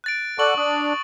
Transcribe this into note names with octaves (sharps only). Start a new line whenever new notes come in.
F#6 A6 D7
A4 D5 F#5 C#6 F#7
D4 D#6